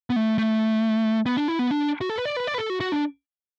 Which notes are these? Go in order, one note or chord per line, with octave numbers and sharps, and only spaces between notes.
B3
A3
A3
B3
D4
E4
B3
D4
F#4
A4
B4
D5
B4
D5
B4
A4
F#4
F#4
D4